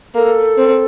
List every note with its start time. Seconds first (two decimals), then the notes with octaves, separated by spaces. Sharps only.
0.14 A#3 A4
0.58 C4